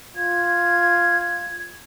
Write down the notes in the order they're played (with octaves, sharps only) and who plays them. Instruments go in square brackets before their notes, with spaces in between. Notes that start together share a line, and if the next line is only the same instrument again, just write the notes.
[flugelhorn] F4 [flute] G#6